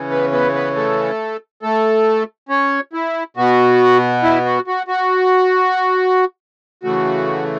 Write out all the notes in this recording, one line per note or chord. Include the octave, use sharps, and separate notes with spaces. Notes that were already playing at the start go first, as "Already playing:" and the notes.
Already playing: C#3 E3 C#4
B3 B4
B3 B4
B3 B4
A3 A4
A3 A4
C#4 C#5
E4
B2 B3 F#4
E4
F#4
F#4
F#4
C#3 E3 A3 F#4